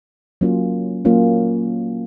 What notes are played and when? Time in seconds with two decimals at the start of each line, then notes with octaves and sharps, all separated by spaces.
0.41 F#3 A#3 C#4 F4
1.05 F#3 A#3 C#4 F4